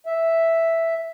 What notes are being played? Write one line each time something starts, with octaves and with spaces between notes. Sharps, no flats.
E5